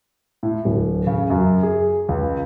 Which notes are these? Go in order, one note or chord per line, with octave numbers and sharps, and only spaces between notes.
A2
D1
C#3
F#2
G#4
C#2